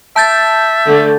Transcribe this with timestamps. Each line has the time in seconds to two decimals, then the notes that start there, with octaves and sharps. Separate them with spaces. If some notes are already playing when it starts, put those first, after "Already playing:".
0.16 E5 A5 G6 A6
0.86 D3 A3